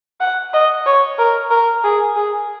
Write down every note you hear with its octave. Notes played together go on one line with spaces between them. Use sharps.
F#5
D#5
C#5
A#4
A#4
G#4
G#4